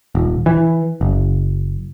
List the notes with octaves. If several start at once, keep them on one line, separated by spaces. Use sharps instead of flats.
D#1
E3
F#1